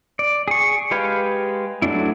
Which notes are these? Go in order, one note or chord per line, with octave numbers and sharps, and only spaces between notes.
D5
G#4 C#6
G#3 G4 B4 F5 G#5
F#3 A3 D4 E4